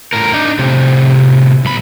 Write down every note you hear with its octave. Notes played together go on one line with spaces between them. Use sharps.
A2 A#4
D4 D#4
A2 C3
B1 B5